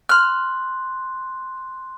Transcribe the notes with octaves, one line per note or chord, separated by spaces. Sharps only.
C6 F6 F#6